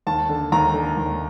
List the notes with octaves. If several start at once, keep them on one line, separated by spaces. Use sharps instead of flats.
D#2 A5
D3
D#2 A#5
D3
D#2